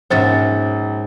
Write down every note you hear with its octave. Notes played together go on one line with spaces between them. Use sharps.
A#1 G#2 B2 C#4 C5 A6